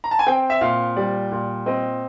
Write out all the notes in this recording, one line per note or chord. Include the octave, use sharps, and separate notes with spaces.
A#5
A5
G#5
C4 G5
E5
A#2 F5
G3 D5
A#2
C4 D#5